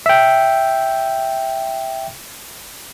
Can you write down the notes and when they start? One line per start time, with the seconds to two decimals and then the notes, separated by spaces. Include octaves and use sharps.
0.06 E5 G5